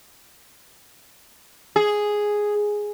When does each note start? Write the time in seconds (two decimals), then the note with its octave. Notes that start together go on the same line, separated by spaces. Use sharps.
1.76 G#4